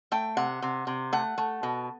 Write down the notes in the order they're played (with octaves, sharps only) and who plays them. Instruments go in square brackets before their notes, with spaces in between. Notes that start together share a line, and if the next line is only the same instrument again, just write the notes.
[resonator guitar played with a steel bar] A3 G5
C3 F#5
C3
C3
A3 F#5
A3
B2